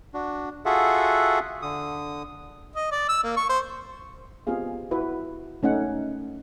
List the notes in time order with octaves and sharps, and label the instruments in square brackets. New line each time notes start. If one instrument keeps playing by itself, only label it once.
[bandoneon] D4 F#4
F4 F#4 G#4 A4 E5 F#5
D3 D#6
[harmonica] D#5
D5
E6
A#3
C#6
C5
[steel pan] B3 C4 F4 G4 G#4 F5
E4 F#4 B4 E5
A3 C#4 D#4 F#5